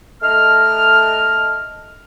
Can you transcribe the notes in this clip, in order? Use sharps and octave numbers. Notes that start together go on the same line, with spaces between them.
A3 D#4 D#5 A5 F6